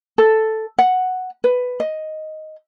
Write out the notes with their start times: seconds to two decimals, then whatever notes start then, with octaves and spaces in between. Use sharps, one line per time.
0.18 A4
0.79 F#5
1.44 B4
1.80 D#5